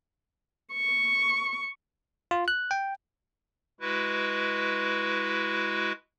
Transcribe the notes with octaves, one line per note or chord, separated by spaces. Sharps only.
C#6
F4
F#6
G5
G#3 E4 F#4 B4